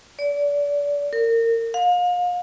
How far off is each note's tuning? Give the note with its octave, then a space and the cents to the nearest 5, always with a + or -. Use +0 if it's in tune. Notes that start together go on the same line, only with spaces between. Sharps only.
D5 -30
A#4 -30
F5 +35